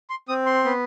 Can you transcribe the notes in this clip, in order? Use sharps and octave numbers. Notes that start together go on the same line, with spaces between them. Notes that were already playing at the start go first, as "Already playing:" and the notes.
C6
C4 D#6
C6
B3